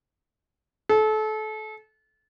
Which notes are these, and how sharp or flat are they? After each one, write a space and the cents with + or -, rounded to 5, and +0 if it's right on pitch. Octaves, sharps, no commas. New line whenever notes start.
A4 -30